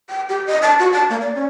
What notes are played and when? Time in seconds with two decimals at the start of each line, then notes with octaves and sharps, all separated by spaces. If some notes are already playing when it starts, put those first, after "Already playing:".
0.09 G5
0.29 G4
0.47 D#5
0.62 A5
0.79 F#4
0.92 A5
1.10 A#3
1.21 D5
1.35 C#4